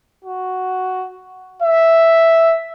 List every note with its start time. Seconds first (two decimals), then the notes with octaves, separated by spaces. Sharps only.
0.24 F#4
1.62 E5